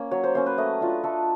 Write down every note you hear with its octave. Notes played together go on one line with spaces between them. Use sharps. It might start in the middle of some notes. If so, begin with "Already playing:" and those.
Already playing: A#3 C#4
F#3 C#5
C5
A#3 C#4 C5
B4
A3 D#5
D4 F4
A3 A4